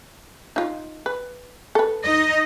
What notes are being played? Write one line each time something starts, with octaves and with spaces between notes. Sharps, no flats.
D#4 F4
B4
A4 B4
D#4 D#5